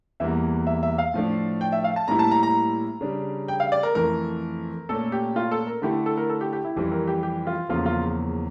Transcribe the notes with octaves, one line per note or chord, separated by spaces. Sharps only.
E2 E3 G3 A#3 E5
E5
E5
F5
A2 F3 A3 D4
G5
E5
F5
A5
A2 G3 A#3 E4 A#5
A5
A#5
A#5
C#3 G3 D4
G5
F5
D5
A#4
F2 E3 A3 A#4
A#2 A3 C#4 A4
G4
F4
A4
A#4
D3 A3 E4 G4
A4
A#4
A4
G4
G4
E4
F2 E3 G3 G4
A#4
G4
G4
F4
E2 C#3 F3 A#3 F4
F4